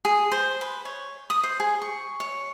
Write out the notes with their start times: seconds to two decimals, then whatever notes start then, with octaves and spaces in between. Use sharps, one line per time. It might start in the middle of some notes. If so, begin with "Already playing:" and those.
0.05 G#4
0.32 C5
0.61 B4
0.85 C#5
1.30 D#6
1.43 C5
1.60 G#4
1.82 C#6
2.20 C#5